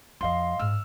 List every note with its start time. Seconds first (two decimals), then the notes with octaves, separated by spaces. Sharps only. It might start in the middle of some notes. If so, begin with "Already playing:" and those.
0.21 F2 F3 D#5 F5 C6
0.59 G#2 E6 F6